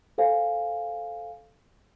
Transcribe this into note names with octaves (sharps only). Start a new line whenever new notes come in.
A4 C5 F5 G#5